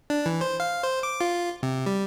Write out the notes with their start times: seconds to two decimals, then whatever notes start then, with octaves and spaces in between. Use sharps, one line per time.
0.10 D4
0.26 E3
0.41 C5
0.60 F5
0.83 C5
1.03 D6
1.21 F4
1.63 C3
1.86 G3